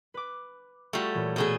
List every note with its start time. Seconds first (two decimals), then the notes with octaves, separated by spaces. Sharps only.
0.14 B4 D6
0.93 G3 A3 F4 F#4
1.13 A#2 E3 C#5
1.36 B2 A3 G#4